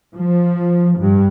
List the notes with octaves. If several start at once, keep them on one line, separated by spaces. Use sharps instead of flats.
F3
G2